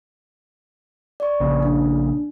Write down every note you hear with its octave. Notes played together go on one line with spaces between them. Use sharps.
D5 C#6
A#1 C#3
D4